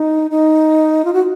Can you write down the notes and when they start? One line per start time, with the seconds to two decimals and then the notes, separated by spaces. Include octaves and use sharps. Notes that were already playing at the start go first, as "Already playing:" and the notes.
Already playing: D#4
0.31 D#4
1.05 F4
1.13 F#4